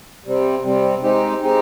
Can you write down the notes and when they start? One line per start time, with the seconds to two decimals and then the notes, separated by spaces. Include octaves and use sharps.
0.25 C3 G3 C4
0.63 C3 G3 C4
1.03 G#3 C4 D#4 G4
1.42 G#3 C4 D#4 G4